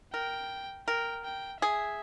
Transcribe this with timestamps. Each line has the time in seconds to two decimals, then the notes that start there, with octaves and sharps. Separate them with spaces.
0.14 A#4 G5
0.88 A#4 G5
1.25 G5
1.62 G#4 E5